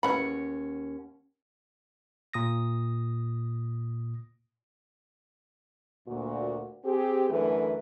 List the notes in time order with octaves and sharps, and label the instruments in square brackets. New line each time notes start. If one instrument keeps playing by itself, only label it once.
[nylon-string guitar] D#2 C#4 F#5 [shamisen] C#3 E3 B5
[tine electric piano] A#2 D#6 A#6
[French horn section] D2 A#2 F#4
C4 G4 G#4
F#2 D3 E3 A3 A4 B4